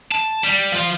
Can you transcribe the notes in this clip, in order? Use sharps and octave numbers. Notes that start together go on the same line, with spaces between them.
A5
G3
F3 F4